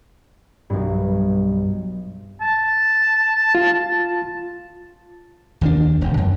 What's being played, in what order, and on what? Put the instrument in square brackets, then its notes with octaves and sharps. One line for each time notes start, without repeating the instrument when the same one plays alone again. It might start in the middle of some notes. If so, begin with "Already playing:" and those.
[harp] B1 G2
[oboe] A5
[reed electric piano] F4
[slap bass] D#2 D#3 D4
E1 D2
F#2